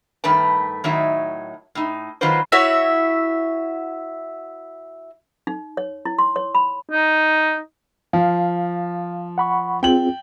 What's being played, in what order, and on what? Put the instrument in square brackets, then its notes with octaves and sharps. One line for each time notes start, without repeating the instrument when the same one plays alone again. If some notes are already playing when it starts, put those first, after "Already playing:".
[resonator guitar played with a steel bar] G2 D#3 A3 B4 A5
A2 D#3 F#3 D#4 E5
A2 D#4
D#3 F#3 F4 F#4 B4 C5
[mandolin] E4 F#4 C#5 E5
[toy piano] D#4
C#5
E4
C6
C#5
B5
[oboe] D#4
[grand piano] F3 [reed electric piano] F5
[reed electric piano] F#5 B5 C#6
[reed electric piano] C4 F4 G#4 [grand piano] G5 F#7